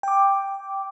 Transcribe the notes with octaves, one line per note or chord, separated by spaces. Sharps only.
G5 D6